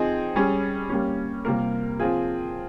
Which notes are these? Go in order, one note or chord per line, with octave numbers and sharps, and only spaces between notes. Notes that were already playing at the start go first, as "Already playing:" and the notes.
Already playing: F3 C4 D#4 G#4
G3 C#4 G#4
G3 A#3 C#4
C3 G3 A#3 F4 A#4
F3 C4 F4 G#4